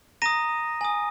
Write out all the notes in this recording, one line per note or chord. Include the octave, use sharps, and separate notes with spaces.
A#5 D#6 A#6 D#7
G#5 D#6